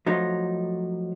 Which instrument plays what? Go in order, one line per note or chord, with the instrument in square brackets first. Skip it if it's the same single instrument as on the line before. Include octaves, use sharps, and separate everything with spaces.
[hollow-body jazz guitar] F3 F#3 A3 D#4